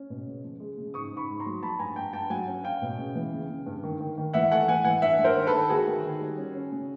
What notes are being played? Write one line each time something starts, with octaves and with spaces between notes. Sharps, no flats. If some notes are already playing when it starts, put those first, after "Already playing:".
Already playing: C#4
B2
C#3
F3
G#3
C#3
G#2 C#6 D#6
G#2
B5 C#6
G#2
A#5 C6
F#3
F3 A5 B5
G2 G#5 A#5
G2 G5 A5
G2 G5 A5
F#3 F#5 G#5
C#4
C#4 F5 G5
B2
C#3
E3
C#3
C#3
G2
D#3
D#3
D#3
E3 E5 F#5
A3 F#5 G#5
E3 F#5 G#5
E3 F#5 G#5
G2 E5 F#5
G2
A#4 C5
D#3
A4 B4
D#3
D#3 F#4 G#4
D#3
D#3
G3
C#4
C#4
C#3